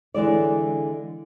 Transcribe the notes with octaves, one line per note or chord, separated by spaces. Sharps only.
D3 E3 G#3 D5